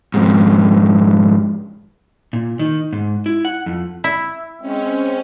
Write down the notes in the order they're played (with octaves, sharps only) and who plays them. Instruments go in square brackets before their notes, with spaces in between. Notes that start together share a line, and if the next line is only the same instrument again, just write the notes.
[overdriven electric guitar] F2 G#2
[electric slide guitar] A#2
D#3
G#2
E4
F#5
F2
[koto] E4
[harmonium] G#3 C4 [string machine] C#4